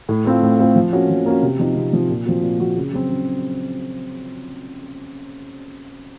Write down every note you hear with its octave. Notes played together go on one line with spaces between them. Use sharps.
A2
A3 C4 F4
A2
A3 C4 F4
F3
A#3 C#4 F#4
F3
A#3 C#4 F#4
C3
F3 C4 D#4
C3
F3 C4 D#4
A#2
F3 C4 F#4
A#2
F3 C4 F#4
C#3
F#3 C4
C#3